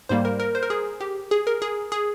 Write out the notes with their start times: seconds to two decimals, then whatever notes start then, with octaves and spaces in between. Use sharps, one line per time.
0.09 G#2 G3 A#3 C5
0.25 A#4
0.40 A#4
0.55 C5
0.63 A#4
0.70 G#4
1.01 G4
1.31 G#4
1.47 A#4
1.62 G#4
1.92 G#4